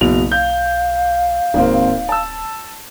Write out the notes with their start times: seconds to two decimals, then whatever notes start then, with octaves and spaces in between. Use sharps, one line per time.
0.01 F#1 B1 B2 F7
0.32 F5 G6
1.54 D1 G#1 A#3 C4
2.09 A5 E6